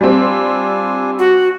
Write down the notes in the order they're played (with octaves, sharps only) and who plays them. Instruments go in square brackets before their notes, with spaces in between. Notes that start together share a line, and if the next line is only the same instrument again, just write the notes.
[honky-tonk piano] G3 C4 [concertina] D4 F4 G#5
[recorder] F#4